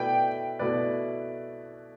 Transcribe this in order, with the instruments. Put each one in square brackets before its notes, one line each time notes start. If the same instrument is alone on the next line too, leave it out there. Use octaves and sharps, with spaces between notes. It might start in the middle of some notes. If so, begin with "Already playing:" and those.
Already playing: [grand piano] B2 A3 E4 B4 D5 [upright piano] G5
[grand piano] B2 A3 E4 B4 D5